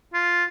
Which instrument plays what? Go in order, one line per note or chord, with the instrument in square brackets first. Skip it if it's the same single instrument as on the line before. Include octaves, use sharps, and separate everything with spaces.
[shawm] F4